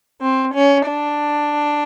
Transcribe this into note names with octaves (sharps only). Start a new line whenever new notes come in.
C4
C#4
D4